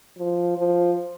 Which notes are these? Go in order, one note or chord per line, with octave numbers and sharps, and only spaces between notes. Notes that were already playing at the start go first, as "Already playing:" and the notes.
F3
F3